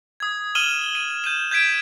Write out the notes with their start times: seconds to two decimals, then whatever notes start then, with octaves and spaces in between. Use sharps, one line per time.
0.20 D#6 G#6
0.55 D#6 F6 D#7 E7 F#7 G7
0.95 D#7 G7
1.24 G6 D#7 E7
1.51 G6 G#6 B6 D7 E7